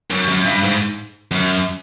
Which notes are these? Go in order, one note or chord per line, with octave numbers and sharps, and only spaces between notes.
F#2
F#2
G2
G#2
F#2